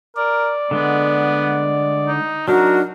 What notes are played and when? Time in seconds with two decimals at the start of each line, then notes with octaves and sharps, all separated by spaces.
0.16 A#4 D5
0.71 D3 G#3 B3
2.07 D#4
2.48 F#3 D4 D#4 F#4 A#4